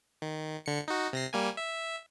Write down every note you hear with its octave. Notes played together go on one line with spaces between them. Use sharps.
D#3
D3 C#7
D#4 F#4
C3 A#6 C7
G3 A#3 G#5
E5